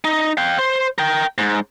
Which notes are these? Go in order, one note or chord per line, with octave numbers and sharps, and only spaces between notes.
D#4
F5 G5
C5
A#4 G5
G#2